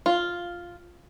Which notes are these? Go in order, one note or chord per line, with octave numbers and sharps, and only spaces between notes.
F4